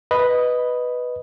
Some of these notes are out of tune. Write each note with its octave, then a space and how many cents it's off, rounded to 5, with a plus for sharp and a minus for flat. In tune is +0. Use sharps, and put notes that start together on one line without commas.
B4 +0 D#5 +0